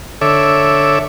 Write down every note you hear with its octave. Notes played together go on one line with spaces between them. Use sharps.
D3 A4 C#5 E5 D6